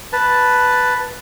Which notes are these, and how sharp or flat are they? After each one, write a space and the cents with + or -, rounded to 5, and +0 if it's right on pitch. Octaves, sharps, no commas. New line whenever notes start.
B4 +0 A5 +0